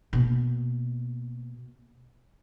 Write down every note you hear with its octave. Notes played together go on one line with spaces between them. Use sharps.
B2 A#3